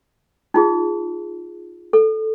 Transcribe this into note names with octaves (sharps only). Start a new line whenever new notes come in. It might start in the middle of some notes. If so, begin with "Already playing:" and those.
D#4 F4 G#4
A4